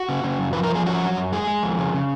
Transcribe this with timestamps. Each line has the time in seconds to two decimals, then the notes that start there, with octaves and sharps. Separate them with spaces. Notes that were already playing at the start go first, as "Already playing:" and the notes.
Already playing: F#4
0.09 C#3
0.24 C#3
0.39 F#2
0.53 F3 B4
0.63 A#4
0.70 F3 G#4
0.86 C#4 F#4
1.01 F#3
1.17 F#2
1.32 G#3 G#4
1.47 G#3
1.63 F2
1.78 C#3
1.94 C#3